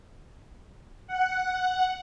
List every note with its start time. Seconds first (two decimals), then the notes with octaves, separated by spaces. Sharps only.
1.07 F#5